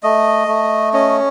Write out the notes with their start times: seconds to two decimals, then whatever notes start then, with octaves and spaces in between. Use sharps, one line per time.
0.03 A3 D#5
0.48 A3
0.93 C#4 D#5